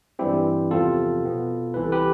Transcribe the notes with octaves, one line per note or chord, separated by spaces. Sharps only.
G2 E3 G3 C4 E4 G4
E2 C3 F3 C4 F4 A4
B2 B3
C2 C3 E3 B4
A4
G4 B4